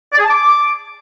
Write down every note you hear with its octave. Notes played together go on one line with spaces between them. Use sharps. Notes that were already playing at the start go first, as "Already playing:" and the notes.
D5
G#4
A5
D6